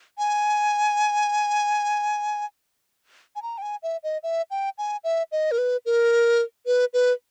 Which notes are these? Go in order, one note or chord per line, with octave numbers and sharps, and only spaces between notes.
G#5
G#5
A#5
G5
G#5
E5
D#5
E5
G5
G#5
E5
D#5
A#4
B4
A#4
B4
B4